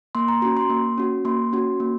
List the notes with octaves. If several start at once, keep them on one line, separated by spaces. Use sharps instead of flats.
A#3 C6
A#5
C#4 F#4 A#5
C6
A#3
C#4 F#4
A#3 C6
C#4 F#4
A#3